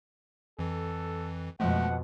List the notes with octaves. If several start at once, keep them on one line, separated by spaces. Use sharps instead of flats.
F2 E3 A4
F2 B2 F3 G#3 A3 F#5